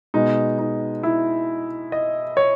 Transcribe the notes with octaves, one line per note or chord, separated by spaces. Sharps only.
B2 G#3 D#4
D#4
E4
D#5
C#5